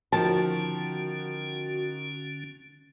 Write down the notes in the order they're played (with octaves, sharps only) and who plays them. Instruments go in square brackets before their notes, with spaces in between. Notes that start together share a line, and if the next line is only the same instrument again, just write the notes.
[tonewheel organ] D3 C#4 [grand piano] D#3 F3 [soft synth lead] F#4 [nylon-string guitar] A5